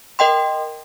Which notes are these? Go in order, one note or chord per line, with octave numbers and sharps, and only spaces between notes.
A#4 D#5 G5 C6